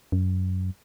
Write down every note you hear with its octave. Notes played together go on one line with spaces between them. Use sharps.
F#2